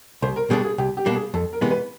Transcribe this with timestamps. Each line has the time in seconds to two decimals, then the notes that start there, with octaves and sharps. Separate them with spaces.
0.22 C2 C5
0.36 A#4
0.50 B2 G3 A#3 D4 G#4
0.65 G#4
0.78 C2 G4
0.97 G4
1.06 B2 G3 A#3 D4
1.15 G#4
1.34 F2 A4
1.53 A#4
1.61 C3 E3 G#3 B3
1.71 B4